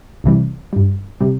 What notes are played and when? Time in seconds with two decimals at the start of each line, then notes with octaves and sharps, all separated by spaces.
0.24 C2 C3 E3 G3
0.73 G2 G3
1.21 C3 G3